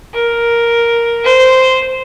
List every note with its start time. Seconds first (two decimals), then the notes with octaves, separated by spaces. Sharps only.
0.14 A#4
1.24 C5